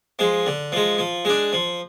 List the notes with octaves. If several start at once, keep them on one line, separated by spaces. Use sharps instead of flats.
F3 G#3
D3
F3 G#3
F3
G#3 D4
F3